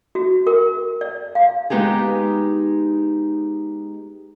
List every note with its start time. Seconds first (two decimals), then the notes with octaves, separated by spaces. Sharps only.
0.15 F#4
0.47 A#4
1.01 D5
1.35 F5
1.70 G#3 B3 D#4 G4 G#4